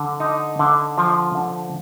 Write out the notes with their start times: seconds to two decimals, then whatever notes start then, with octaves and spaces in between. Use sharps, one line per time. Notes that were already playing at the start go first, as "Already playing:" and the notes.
Already playing: D3
0.20 D#4
0.59 D3
0.98 F3
1.35 D3